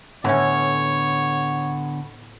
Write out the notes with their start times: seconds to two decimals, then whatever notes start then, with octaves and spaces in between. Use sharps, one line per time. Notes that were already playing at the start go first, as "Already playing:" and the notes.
0.24 A2 D3 B3 C#4 C#5